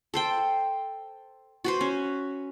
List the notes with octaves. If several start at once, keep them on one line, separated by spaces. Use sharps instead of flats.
A4 C5 G5
F#4 B4 C5
C#4